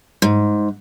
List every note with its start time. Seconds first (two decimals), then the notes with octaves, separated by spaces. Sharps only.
0.22 G#2